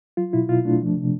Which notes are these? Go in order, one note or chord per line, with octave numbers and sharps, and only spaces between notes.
F#3 F4
B2 E4
B2 F4
A3 D4
F3
C3